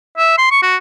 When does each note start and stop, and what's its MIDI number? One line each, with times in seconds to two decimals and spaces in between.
0.18 0.38 76
0.38 0.47 84
0.51 0.59 85
0.62 0.76 66